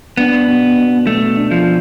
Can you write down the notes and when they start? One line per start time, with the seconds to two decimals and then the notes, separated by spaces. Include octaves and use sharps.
0.17 B3 D4
0.48 B2
0.77 B2
1.07 B2 A3
1.37 D4
1.51 F3